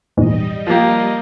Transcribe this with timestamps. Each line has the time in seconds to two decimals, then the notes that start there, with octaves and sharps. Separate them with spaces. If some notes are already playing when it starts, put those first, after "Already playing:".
0.17 A#1 E2 G#2 G3 D#5
0.67 F3 A#3 G4